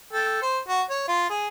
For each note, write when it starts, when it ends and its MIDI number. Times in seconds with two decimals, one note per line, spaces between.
0.13 0.41 69
0.13 0.41 79
0.42 0.59 72
0.68 0.81 66
0.90 1.05 73
1.08 1.28 65
1.30 1.48 68